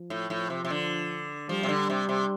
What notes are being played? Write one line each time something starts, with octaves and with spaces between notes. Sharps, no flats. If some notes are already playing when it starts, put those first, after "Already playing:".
Already playing: F3
A2
A2 F3
C3
C3
D3
F3 G3
C3
D3
C3
C3